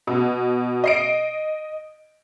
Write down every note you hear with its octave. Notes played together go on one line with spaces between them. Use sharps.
B2
D#5 C7 D7